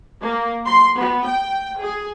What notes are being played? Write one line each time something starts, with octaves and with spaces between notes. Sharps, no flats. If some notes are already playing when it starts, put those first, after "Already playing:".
A#3
C6
B3
G5
G#4